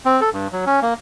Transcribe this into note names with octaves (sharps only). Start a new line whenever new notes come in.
C4
A4
G2
F#3
C#4
A#3